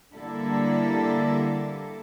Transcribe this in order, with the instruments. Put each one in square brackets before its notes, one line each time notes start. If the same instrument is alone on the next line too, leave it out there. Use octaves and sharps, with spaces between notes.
[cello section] D3 G3 A#3 E4 A4